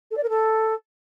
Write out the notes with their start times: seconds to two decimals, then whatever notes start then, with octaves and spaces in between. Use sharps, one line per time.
0.11 A4
0.17 D5
0.23 A#4
0.29 A4